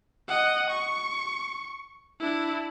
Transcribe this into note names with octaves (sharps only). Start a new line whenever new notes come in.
D#5 F#5
C#6
D4 E4